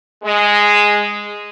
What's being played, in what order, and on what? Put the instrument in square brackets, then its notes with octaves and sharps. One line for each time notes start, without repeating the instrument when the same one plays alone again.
[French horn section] G#3